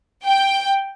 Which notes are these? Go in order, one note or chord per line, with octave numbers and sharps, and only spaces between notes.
G5